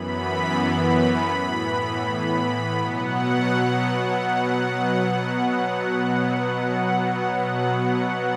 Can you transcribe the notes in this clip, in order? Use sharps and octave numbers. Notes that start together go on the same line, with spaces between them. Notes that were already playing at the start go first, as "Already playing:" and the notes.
Already playing: F#2 E3 B3 B5
B5
A2 E3 B3
B5
B2 F#3 B3 F#5
F#5
F#5